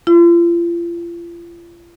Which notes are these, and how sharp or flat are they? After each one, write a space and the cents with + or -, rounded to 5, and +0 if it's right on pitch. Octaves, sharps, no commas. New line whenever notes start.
F4 -40